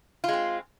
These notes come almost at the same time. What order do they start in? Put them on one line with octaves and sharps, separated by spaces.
F4 G#3 C4